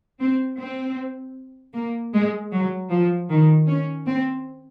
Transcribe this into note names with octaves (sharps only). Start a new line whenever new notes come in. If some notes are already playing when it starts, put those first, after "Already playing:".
C4
C4
A#3
G#3
F#3
F3
D#3
C#4
C4